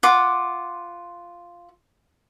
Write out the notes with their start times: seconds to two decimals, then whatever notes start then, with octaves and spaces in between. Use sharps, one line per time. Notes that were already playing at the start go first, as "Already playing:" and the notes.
0.03 F4 F#5 D6